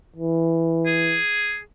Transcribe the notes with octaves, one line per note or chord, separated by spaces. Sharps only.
E3
G#4